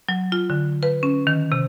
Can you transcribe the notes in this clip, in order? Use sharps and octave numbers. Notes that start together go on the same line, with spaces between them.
F#3
F4
D3
B4
C#4
D#3
C3